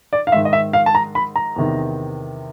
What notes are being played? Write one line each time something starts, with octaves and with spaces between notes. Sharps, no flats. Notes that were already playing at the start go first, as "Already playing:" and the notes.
D5
F5
G#2 D#3 E5
D#5
E5
F5
A5
A#5
B5
A#5
E2 C3 D#3